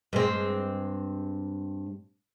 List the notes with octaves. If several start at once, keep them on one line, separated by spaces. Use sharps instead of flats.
G2 G#3 C4